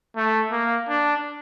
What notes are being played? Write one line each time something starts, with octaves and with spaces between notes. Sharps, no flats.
A3
A#3
D4